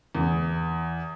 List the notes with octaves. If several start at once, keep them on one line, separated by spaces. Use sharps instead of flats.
E2